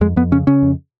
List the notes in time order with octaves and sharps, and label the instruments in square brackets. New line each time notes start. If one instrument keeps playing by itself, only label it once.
[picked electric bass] F2 G#3
F2 B3
C#3 C#4
C#3 C#4
F2